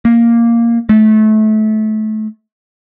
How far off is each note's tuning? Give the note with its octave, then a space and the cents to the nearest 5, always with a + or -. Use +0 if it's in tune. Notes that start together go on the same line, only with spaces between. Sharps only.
A#3 +0
A3 -25